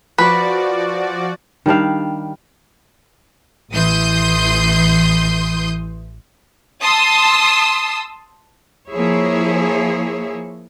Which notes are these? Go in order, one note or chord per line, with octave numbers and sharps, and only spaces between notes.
F3 F#4 B4 D5
D#3 G3 D4 F5
A1 E3 C6 D#6 G6
A5 C6 D#6 E6
F3 A#3 E4 G#4 C#5 E5